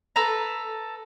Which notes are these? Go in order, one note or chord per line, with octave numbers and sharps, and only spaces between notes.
A4 B4 A5 A#5